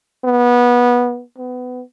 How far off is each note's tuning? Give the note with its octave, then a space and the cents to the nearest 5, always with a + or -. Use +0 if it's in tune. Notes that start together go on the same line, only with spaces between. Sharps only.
B3 -20
B3 +25